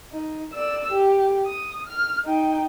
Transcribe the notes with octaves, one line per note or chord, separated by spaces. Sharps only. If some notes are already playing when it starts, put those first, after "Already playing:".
D#4
D5 E6
G4
D#6
F6
D#4 G5